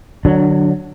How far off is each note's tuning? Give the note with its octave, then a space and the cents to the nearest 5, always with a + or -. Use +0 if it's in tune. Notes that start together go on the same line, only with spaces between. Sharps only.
D3 +30 F#3 +0 D4 +0